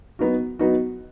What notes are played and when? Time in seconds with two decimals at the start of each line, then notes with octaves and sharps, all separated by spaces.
0.19 F#3 B3 D#4 F#4
0.59 F#3 B3 D#4 F#4